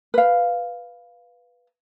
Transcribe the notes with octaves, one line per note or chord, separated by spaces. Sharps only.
B4 F5